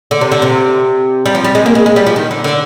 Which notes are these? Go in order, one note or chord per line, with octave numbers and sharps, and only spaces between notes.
D3
C3
D3
C3
G3
F3
G3
G#3
A#3
G#3
G#3
G3
F3
D#3
D3
D3